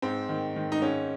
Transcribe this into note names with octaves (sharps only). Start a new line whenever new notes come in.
G#2 C4
D#3
D#3
D#4
G#2 C#4